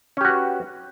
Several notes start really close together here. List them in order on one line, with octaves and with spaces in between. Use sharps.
C#4 G4 F#4 B4